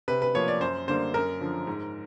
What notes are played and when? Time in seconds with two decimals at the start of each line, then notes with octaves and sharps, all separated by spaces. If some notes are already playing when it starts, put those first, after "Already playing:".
0.08 C3 B4
0.22 B4
0.35 F3 A#3 C#5
0.48 D5
0.61 F#2 C5
0.88 D3 G3 A#3 C5
1.14 F#2 A#4
1.41 D3 F3
1.67 G#2